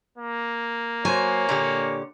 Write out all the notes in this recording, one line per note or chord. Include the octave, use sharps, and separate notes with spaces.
A#3
F#3 C5 C#5 G#5
A#2 D3 G4